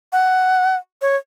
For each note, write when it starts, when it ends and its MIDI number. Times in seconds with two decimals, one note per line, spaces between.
0.12 0.76 78
1.01 1.16 73